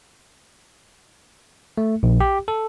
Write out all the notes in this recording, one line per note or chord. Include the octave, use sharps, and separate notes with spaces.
A3
A#1
G4
A4